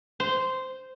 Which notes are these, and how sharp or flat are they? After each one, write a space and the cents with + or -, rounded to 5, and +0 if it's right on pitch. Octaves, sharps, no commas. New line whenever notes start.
C5 -10